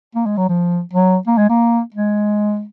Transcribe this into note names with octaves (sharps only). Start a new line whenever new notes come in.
A#3
G#3
F#3
F3
F#3
A#3
G#3
A#3
G#3